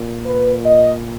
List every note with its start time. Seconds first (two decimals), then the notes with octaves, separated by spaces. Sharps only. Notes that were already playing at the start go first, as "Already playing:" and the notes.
Already playing: A#2
0.26 B4
0.65 D#5